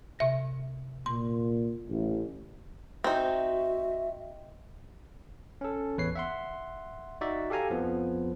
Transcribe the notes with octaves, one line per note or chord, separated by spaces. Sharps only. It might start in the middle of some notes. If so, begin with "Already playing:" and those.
C3 E5 A#6
A#2 C6
A1
C4 D#4 F#4 E5
C#4 A4
A1 E2 B4 C#5 C7
E5 F#5 C6
D#4 F#4 D5 E5
G4 A4 F5 G#5 A#5
F2 F3 B3